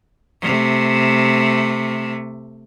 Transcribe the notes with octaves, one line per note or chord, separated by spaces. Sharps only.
C3 A3